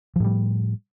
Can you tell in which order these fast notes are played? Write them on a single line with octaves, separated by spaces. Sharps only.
F3 A2 G3